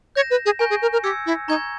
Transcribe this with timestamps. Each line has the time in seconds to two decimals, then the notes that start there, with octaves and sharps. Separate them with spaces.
0.15 C#5 G6 A#6 E7
0.30 B4
0.46 G#4
0.59 A#4 G#5 C#6 G6 A#6
0.70 G#4
0.82 A#4
0.93 A#4
1.03 G4 E6 G#6 C#7
1.26 E4
1.48 D#4 A#5 C#6 G#6